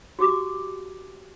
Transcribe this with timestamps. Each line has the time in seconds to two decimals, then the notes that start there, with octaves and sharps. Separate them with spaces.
0.19 F#4 G4 D6